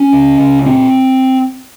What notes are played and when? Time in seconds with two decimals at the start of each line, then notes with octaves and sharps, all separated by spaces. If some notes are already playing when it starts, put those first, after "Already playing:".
Already playing: C#4
0.13 C#2
0.39 C#2
0.65 A#2 C4